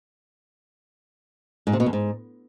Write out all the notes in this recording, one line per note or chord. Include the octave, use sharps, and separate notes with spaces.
G#2
C3
B2
E2
G#2